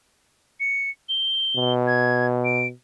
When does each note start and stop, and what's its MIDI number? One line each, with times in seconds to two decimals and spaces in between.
0.60 0.90 97
1.09 1.72 103
1.56 2.71 47
1.87 2.26 92
2.45 2.67 98